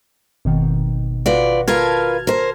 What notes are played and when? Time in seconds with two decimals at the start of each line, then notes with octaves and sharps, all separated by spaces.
0.45 G#1 B2 D#3
1.26 F4 F#4 B4 D5
1.68 F4 A#4 B4 A5 F6 G#6
2.27 A#4 C5